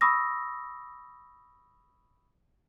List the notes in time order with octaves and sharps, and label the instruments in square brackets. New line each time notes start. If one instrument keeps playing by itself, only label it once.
[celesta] B5 C#6 D#6 E6 A#6